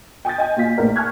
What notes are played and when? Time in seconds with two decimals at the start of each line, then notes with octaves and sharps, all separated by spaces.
0.25 G5 G#5 D#6 G6 A6
0.38 D#5 G5 G#5
0.57 A#2 F4 B6
0.77 A#1 A3 A#4 D5
0.96 G#5 A5 C#6 F6 F#6 G#6